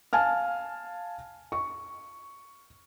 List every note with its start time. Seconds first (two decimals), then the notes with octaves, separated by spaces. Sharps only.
0.13 F5 G#5 A5 F6
1.52 C#6